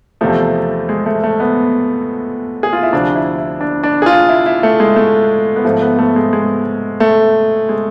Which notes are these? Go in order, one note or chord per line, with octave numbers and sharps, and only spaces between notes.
E2 C3 F3 A3
G#3
A3
A3
B3
G#4
F4
E4
D2 C3 F3 D4
E4
E4
D4
D4
G#4
F4
E4
E4
A3
G#3
A3
B3
G#2 F3 A3
B3
A3
G#3
G#3
A3
G#3